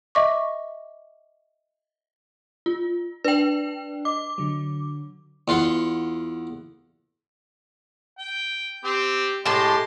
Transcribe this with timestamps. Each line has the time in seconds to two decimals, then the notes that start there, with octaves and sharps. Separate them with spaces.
0.15 D#5 E5 C#6 D6
2.66 F4
3.24 D4 B4 G5
4.05 D#5 D6
4.38 D3 F#3
5.48 E2 F4 F#5 C6
8.19 G5
8.84 C4 G4
9.46 A2 G#3 G4 D#5 A5 C6